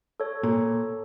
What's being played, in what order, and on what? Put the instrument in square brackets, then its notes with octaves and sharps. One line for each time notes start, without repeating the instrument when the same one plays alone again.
[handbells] A4 C#5
[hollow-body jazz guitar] A#2